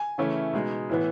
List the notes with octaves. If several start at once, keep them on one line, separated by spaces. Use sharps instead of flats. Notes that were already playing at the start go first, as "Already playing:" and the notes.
Already playing: G#5
C#3 E3 A3 C#4 E4
B2 G#3 D#4
A2 E3 B3